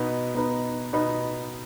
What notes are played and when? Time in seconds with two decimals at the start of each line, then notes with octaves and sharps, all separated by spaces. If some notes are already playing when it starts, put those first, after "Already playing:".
Already playing: B2 B3 D#4 B4
0.34 B2 B3 D#4 B4
0.93 B2 B3 D#4 B4